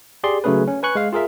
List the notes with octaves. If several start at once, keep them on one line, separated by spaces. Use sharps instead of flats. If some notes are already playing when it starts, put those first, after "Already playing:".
G4 G#4 D5 C6
C#3 F#3 A3 C#4 G#4 B4
C#4
B4 G#5 C#6 F#6
G#3 F5
F4 G#4 A#4 E5